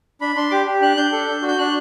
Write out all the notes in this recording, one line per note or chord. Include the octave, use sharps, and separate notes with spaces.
D4 B5
D4 C6
G4 D6
G4
D4 F#6
D4 G6
A4
D4
F#4
G6
D4 F#6